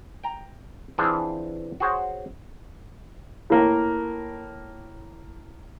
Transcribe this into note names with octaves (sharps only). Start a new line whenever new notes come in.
G5 A#5
E3 C4 D4 F4 G#4 C5
F#4 G#4 C5 C#5
A2 A#3 A#4